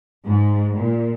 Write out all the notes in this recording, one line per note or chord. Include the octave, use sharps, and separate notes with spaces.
G#2
A#2